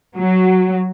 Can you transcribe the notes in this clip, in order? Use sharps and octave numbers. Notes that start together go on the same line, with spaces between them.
F#3